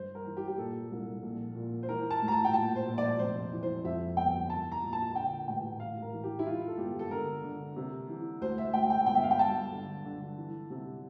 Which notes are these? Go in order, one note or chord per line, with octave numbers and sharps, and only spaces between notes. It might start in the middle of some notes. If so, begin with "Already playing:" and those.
Already playing: G2 C5
A#4
E3
G4
G4
A#2 A4
C2
A#1
A#2
C5
E3 A#4
A5
A2
A#5
A5
G5
A#2 A5
C5
A#1
D5
F1 C5
E3
C5
F2 E5
G1 G5
C2 A5
A#5
A#2
A5
D3 G5
A1 G5
A1 F5
A#4
E3
G4
E4
E3 F4
A4
G1 G4
A4
D3 A#4
D3
C3
E3
D2 C5
E5
D2 G5
G5
G1 G5
E5
F5
G5
G2 A5
D3
D3
E3
C3